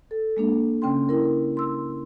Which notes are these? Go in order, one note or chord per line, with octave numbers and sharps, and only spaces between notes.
A4
G#3 A#3 D4
C#3 C#4 G5 C6
E4 A#4
C6 E6